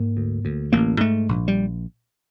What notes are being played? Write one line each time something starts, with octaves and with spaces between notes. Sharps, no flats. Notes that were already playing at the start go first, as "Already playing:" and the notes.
Already playing: G#2 A#3
D2
D2
A1 A#3
G#2 A3
A#1
G3